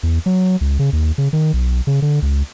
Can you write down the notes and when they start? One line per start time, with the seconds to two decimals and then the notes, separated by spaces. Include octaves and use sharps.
0.03 E2
0.26 F#3
0.61 C#2
0.79 C#3
0.93 D#2
1.18 C#3
1.33 D#3
1.53 B1
1.87 C#3
2.02 D3
2.22 C#2